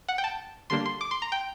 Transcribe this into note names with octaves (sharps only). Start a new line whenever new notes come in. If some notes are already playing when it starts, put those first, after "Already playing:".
F#5
G5
A5
D3 G3 A#3 D4 C6
C6
D6
C6
A#5
G5